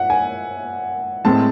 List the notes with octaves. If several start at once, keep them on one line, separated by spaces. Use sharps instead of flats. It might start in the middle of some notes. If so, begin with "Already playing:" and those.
Already playing: E5 F#5
G#5
A2 G#3 C4 A5